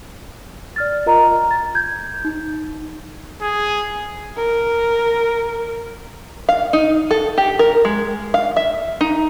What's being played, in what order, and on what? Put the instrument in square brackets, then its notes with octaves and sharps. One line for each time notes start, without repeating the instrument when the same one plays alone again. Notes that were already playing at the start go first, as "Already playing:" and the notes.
[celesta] D5 F6 A6
F4 A#4 D#5 A#5
A6
G6 G#6
D#4
[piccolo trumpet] G#4
[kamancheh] A#4
[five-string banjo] F5
D#4
A4
G4
A#4
G#3
F5
E5
D#4